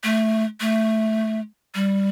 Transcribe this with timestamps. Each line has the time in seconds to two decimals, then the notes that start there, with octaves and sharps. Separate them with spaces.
0.04 A3
0.61 A3
1.75 G3